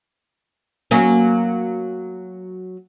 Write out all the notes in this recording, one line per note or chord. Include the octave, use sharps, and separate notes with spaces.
F#3 A#3 C#4